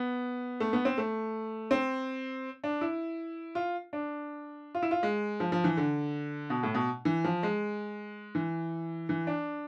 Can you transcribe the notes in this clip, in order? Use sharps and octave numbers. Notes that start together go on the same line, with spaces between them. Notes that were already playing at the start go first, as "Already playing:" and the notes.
Already playing: B3
A3
B3
C4
A3
C4
D4
E4
F4
D4
F4
E4
F4
G#3
F3
F3
E3
D3
B2
A2
B2
E3
F3
G#3
E3
E3
D4